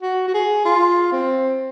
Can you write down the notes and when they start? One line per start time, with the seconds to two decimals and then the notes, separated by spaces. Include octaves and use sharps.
0.03 F#4
0.28 F#4
0.34 G#4
0.65 F4
1.12 C4